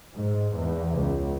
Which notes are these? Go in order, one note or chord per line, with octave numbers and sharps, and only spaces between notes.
G#2
E2
C#2